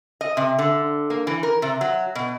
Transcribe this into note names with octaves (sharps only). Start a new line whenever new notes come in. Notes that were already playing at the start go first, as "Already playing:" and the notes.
D#5
C3
D3
A#3
E3
A#4
C3
F#3
B2